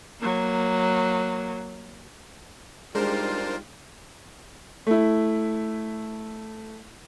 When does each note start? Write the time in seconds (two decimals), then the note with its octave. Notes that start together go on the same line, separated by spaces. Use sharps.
0.20 F#3 A#3
2.95 G3 G#3 D4 D#4 F4 A#4 C5
4.87 A3 E4